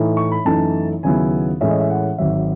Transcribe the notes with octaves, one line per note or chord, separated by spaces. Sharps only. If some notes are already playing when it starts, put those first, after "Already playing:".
Already playing: A2 E3 A3 D#4
C#6
B5
F#2 E3 A3 D#4 A5
D#2 C#3 F#3 B3 E4 G#5
A2 E3 G#3 C#4 E5
D#5
E5
F#5
G#1 G#2 F#3 E5